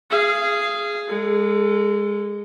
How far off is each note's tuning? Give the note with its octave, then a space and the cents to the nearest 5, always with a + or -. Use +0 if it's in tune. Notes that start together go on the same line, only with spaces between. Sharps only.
G#4 +0 F5 -25
G#3 -15 A4 +20